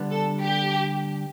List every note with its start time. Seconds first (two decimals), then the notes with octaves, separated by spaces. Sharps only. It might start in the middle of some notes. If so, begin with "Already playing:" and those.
Already playing: D3 G3 B3 D4
0.10 A4
0.41 G4